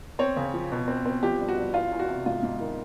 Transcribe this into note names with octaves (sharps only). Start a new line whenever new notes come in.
C4 C#5
C#3
F3
B2
C4
C4
F3 G4
G2
F#4
G2
E2 F4
E2
F#4
C3
G#2 F4
G#2
D#3